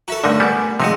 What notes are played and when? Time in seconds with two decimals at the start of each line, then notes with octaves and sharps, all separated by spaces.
0.08 F#4 A4 E5 A#5
0.24 G2 D3 A3 D#4 A#4 D5
0.40 G3 B3 F#5 G#5
0.80 C3 F3 G#3 D#4 F#4